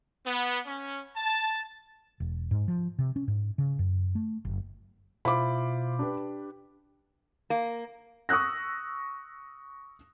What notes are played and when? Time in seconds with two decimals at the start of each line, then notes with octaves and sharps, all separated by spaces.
0.25 B3
0.66 C#4
1.15 A5
2.20 E1
2.51 G#2
2.68 F3
2.98 C3
3.16 C#4
3.28 G#2
3.58 C#3
3.79 F#2
4.15 A3
4.45 F#1
5.25 B2 E4 F4 C5 B5 D6
5.99 D4 G4 B4
7.50 A#3
8.29 C#6 D#6 E6 F#6 A#6